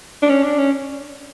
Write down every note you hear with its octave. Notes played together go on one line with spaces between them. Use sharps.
D4
C#4
D4
C#4